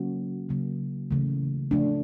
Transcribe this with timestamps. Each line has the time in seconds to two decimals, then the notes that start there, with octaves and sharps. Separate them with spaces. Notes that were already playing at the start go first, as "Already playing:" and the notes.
Already playing: C#3 F#3 A#3 C#4 F#4
0.49 C#3 F#3 A#3
1.11 C#3 E3 A3
1.71 C#3 F3 A3 D4